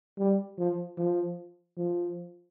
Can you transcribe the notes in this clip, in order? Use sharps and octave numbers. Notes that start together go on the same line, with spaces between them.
G3
F3
F3
F3